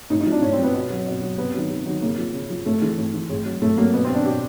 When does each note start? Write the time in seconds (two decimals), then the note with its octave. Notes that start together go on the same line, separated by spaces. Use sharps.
0.10 A2 D#4
0.21 D#4
0.26 F3
0.32 D4
0.42 A2 C#4
0.53 C4
0.58 F3 B3
0.74 B2
0.90 F#3
1.06 B2
1.22 F#3
1.38 C3 B3
1.54 D#3 F#3
1.70 C3
1.86 D#3 F#3
2.02 C#3 A#3
2.18 F3
2.34 C#3
2.50 F3
2.66 A2 A3
2.82 E3 G#3
2.98 A2
3.14 E3
3.29 A2 G#3
3.45 F#3
3.62 A2 A3
3.77 F#3 A#3
3.94 B2 B3
4.05 C4
4.09 F#3
4.15 D4
4.25 B2 G4